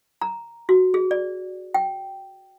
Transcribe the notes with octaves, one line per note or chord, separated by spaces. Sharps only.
A#5
F#4
G#4
D5
G5